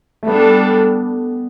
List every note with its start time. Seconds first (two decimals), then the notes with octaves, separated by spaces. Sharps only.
0.23 A3
0.27 G3 B3 D4 A4